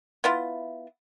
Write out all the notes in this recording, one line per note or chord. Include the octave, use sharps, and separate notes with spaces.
B3 E4 F4